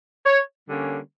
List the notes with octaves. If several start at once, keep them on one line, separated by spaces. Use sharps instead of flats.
C#5
D3 G3 A#3 C#4